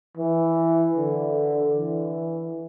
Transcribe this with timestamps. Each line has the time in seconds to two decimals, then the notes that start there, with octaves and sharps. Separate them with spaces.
0.17 E3
0.96 D3
1.75 E3